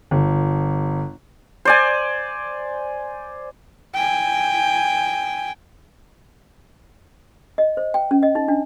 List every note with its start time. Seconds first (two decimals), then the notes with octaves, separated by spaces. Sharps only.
0.11 G1
1.65 C5 D5 G#5
3.94 G5 G#5
7.58 D#5
7.77 C5
7.94 G5
8.11 C#4
8.23 D#5
8.35 D#4
8.48 D4